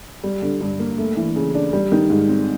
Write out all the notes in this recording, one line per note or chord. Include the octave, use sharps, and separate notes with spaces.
G3
D3
G2
A#3
A3
E3
C#3
D4
G3
D#3
G#2
C4